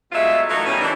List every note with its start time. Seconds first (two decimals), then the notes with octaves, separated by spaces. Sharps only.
0.12 B2 F#3 G#3 A3 F4 E5
0.49 E3 F#3 A3 D#4 A#4
0.66 B2 G3 C#4
0.81 E3 D4